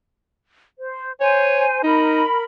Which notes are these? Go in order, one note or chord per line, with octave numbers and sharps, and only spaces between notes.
C5
C5 C#5 G#5
D#4 A#4 B5